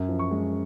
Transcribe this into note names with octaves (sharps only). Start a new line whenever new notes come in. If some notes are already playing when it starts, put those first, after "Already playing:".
Already playing: F#2
F3
C#6
G#3